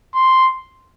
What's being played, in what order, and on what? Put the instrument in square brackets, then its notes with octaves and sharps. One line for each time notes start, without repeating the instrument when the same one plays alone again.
[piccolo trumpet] C6